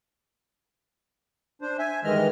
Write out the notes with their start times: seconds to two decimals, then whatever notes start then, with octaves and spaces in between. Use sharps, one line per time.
1.61 D4 C5
1.79 E5 G#5
2.04 G2 D#3 E3 G#3 D#5 F6